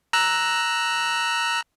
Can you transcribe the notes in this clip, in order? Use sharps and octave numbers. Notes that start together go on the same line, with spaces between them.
A#5 E6 F#6